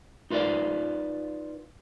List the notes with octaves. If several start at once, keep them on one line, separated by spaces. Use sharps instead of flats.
D#4 F4 B4 C#5 D5 F5